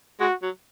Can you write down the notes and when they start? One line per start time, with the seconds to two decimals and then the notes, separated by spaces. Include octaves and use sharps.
0.20 G#3 F#4
0.42 F#3